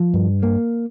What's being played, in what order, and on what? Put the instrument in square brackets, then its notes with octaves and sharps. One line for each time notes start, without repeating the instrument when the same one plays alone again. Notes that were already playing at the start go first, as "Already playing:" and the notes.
Already playing: [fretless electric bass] F3
G2
A#3